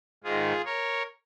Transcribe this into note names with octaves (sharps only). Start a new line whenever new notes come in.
G#2 D#3 F4 G#4
A#4 C#5